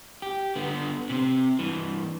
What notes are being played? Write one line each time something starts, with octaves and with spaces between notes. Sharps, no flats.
G4
D3 B3
C3 C4
G2 E3